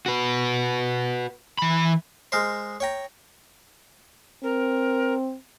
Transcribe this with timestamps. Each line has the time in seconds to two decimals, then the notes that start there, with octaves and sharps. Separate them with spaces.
0.06 F#4 B4
1.59 E3 B5
2.32 G#3 A#4 C5
2.80 C#5 G5 A#5
4.43 C4 A#4